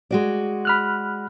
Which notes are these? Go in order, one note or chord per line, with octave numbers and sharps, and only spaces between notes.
G#3 F#4 D5
B5 F6 F#6